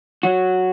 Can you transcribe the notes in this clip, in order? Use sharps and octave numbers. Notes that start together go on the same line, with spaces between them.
F#3 F#4